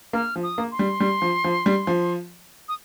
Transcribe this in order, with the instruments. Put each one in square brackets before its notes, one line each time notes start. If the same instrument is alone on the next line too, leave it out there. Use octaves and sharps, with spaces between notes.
[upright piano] A#3 [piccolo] F6
[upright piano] F3
[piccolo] D#6
[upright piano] A#3
[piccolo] C6
[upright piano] G3
G3
F3
F3
G3
F3
[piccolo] D#6